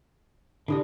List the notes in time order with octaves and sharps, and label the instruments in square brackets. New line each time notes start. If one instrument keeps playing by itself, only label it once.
[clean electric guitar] D3 [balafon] E4 G4 D5